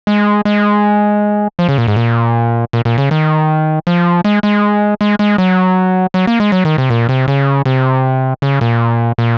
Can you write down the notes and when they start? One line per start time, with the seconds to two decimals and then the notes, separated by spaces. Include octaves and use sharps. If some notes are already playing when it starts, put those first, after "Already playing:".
0.07 G#3
0.45 G#3
1.59 F3
1.69 C#3
1.78 A#2
1.88 G#2
1.96 A#2
2.73 A#2
2.85 A#2
2.98 C#3
3.11 D#3
3.87 F3
4.25 G#3
4.43 G#3
5.01 G#3
5.19 G#3
5.38 F#3
6.14 F#3
6.27 A#3
6.40 G#3
6.52 F#3
6.65 D#3
6.78 C3
6.90 A#2
7.09 C3
7.28 C#3
7.66 C3
8.42 C#3
8.61 A#2
9.18 A#2